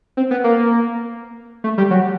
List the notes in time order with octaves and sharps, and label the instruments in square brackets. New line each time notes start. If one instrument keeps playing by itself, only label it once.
[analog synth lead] C4
B3
A#3
A3
G3
F#3